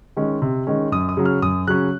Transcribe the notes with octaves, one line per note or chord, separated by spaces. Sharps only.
D#3 G#3 C#4
C3
D#3 G#3 C#4
F#2 D#6
D#6
C#3 F#3 C#4
F6
F#2 D#6
C#3 F#3 C#4 F#6